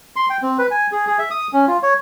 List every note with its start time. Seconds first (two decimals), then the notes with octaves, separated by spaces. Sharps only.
0.16 C6
0.30 G5
0.42 C4
0.58 B4
0.71 G#5
0.92 G#4
1.07 G#4
1.18 E5
1.31 D#6
1.53 C#4
1.68 F4
1.83 C#5